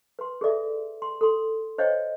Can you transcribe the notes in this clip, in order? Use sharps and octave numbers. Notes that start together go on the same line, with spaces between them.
B4 C6
G#4 A4 D5 E5
C6
A4 C6
C5 C#5 D#5 F5 G5